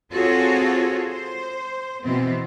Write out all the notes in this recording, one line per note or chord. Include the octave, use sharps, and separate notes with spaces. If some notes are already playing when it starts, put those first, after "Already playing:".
C4 F4 F#4 G#4 A4 C#5
C5
B2 E3 B3 C4